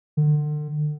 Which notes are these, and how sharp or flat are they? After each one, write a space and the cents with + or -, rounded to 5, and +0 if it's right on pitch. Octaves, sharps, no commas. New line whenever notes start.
D3 +35